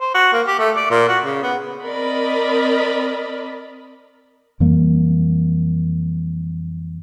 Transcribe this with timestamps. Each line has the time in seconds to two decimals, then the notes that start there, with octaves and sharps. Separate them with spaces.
0.01 C5
0.14 F#4
0.33 A#3
0.47 G4
0.59 A3
0.76 D5
0.90 A#2
1.08 F#4
1.23 C#3
1.43 B3
1.83 C4 A#4 D5 D#5 B5
4.60 F2 E3 G3 A#3